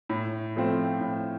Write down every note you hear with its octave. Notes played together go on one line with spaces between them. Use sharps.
A2
F3 A3 C4 F4
A2